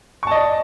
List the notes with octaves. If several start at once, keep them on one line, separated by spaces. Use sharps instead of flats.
D5 D#5 A5 C#6